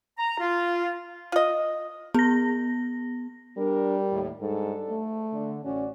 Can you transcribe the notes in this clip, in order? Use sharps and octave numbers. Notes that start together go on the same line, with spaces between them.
A#5
F4
F4 D#5
B3 A#4 A#6
G3 D4 A#4
D#2 A2
G#2 G3 D4 A4
A3
D3
A1 C#4 F#4 D5